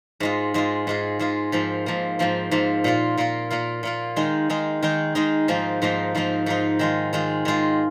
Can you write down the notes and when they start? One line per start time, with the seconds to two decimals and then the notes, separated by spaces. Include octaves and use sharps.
0.20 G#2 G#3 F4
0.54 G#2 G#3 F4
0.87 G#2 G#3 F4
1.19 G#2 G#3 F4
1.52 G#2 F3 A#3
1.86 G#2 F3 A#3
2.19 G#2 F3 A#3
2.51 G#2 F3 A#3
2.84 A#2 A#3 F4
3.17 A#2 A#3 F4
3.50 A#2 A#3 F4
3.83 A#2 A#3 F4
4.16 D#3 G#3 D#4
4.50 D#3 G#3 D#4
4.83 D#3 G#3 D#4
5.15 D#3 G#3 D#4
5.48 G#2 F3 A#3 D#4
5.82 G#2 F3 A#3 D#4
6.15 G#2 F3 A#3 D#4
6.46 G#2 F3 A#3 D#4
6.79 D#3 G#3 F4
7.13 D#3 G#3 F4
7.45 D#3 G#3 F4